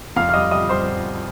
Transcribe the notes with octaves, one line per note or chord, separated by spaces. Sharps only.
F2 F5 F6
F6
G3 D#5 D#6
G3 D#5 D#6
G3 C5 C6